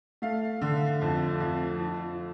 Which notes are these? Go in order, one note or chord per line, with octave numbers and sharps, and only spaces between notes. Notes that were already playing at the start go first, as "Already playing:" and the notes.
A3 F5
D3
F2
F2
F3